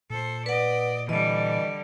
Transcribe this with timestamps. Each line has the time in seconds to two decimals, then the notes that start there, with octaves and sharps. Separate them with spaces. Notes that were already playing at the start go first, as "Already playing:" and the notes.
0.10 A#2 A4 C5
0.46 B4 D5 D#5 F#5
1.09 D3 E3 G3 D#5